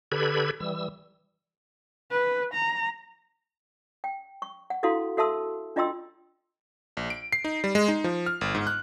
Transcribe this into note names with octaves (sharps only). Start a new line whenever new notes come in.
D3 G4 A4 B4 B5 G#6
E3 G3 E6
B4
A#5
G5
C#6
F#5
D4 E4 F#4 A4 F5 C6
F#4 A4 E5 A5 C6 E6
D4 F4 D#5 G5 C6 E6
A#1
D7
C7
D#4
G3
G#3
D#4
F3
F6
G1
G#2
F#6